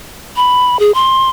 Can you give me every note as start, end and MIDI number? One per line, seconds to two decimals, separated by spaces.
0.36 0.79 83
0.79 0.92 68
0.95 1.30 84